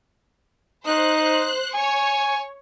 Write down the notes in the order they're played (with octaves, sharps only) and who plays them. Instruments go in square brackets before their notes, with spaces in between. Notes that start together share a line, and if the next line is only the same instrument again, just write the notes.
[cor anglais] D#4 [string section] C5 F#6
[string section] C#5 C#6 [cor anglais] G#5